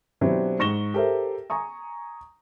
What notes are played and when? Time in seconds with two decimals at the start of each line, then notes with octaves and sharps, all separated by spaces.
0.21 B2 F#3 C4 D4 E4 G4
0.59 G#2 C#6 A#6 E7 G7
0.94 G4 A4 A#4 C5 E5
1.50 G#5 A#5 C#6 D#6